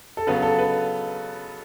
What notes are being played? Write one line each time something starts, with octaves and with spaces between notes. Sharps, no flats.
A4
C#3 F#3 B3 B4
A4
B4